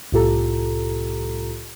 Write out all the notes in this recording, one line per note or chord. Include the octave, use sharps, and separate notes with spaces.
C2 A2 F4 G4 A4 A#5